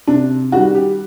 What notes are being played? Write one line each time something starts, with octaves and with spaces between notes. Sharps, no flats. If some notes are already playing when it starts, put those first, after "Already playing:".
C3 D4
D#3 G3 F#4
G4